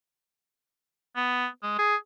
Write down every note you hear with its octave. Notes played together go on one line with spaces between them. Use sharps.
B3
G#3
G#4